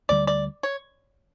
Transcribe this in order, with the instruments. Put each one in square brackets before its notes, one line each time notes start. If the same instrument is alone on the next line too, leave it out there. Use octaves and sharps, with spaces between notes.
[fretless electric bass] D2 D3 G3 [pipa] D5
[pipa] D5
C#5